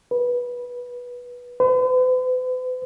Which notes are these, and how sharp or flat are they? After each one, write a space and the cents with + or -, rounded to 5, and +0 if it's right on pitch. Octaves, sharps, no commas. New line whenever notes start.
B4 -15
B4 +45